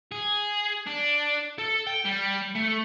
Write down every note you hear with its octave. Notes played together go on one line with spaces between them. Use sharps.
G#4
D4
A4
G5
G3
A3